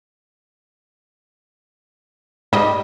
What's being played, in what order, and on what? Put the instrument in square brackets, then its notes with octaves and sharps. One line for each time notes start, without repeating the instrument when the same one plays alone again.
[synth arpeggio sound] G#2 D#5 [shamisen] G3